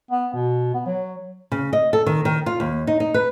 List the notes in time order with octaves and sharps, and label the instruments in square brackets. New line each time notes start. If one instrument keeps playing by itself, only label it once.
[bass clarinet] B3
B2
B3
F#3
[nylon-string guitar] C#3
D#5
A4
D#3
D#3
F4
D#2
D#4
D#4
B4